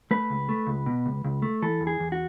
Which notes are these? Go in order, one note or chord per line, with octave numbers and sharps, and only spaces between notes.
A3 B4
C#2
A3
C#2
B2
C#2
C#2
A3
E3 A4
E2
G#4
E2
F#4